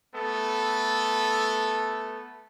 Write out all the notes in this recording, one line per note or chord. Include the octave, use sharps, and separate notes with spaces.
A3 B3 A4